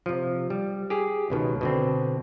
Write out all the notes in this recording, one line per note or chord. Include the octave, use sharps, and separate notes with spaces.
C3 F3
G3
G4 G#4
C#2 B2 D#3
B2 D3 C4